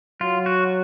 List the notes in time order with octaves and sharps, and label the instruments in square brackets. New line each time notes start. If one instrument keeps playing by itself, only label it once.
[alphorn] F#3 [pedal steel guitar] F4
[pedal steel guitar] F#4